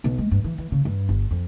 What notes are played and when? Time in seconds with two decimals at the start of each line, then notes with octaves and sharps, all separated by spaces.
0.04 B1
0.18 G#3
0.31 G2
0.44 E3
0.58 E3
0.72 C#3
0.85 G2
1.09 G1
1.31 F2